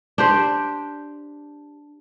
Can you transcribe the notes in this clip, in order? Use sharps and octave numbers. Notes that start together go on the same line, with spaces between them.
D4 G4 C5